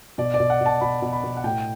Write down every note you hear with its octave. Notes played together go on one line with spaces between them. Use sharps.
B2 D5
D5
B2
F#5
B2
A5
B2 B5
B2
B5
B2
F#5
A2 G5